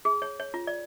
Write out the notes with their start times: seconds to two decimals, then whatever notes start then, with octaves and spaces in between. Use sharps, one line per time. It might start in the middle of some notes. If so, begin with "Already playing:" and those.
0.05 G#4
0.22 C#5
0.40 C#5
0.54 F4
0.67 D5